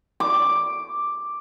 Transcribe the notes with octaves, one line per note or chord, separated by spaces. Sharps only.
D6